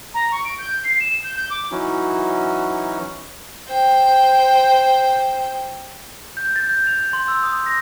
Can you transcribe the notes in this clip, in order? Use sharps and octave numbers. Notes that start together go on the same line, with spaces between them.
A#5
C#6
D7
G6
C7
E7
G6
G6
D6
E3 F#3 C#4 D#4 E4 F#4
C5 G5
G6
A6
G6
F7
C6
E6
D#6
A#6